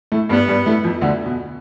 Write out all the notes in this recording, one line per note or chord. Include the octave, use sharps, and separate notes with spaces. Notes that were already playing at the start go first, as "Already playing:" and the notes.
A2 A3
G2 G3 B3
G2 G3
A2 A3
F2 F3
D2 D3
B2